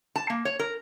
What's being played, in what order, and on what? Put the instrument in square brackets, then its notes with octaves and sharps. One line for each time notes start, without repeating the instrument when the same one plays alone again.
[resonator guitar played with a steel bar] A5
A#3
C#5
A#4